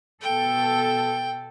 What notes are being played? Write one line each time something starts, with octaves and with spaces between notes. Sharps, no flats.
B2 A4 G5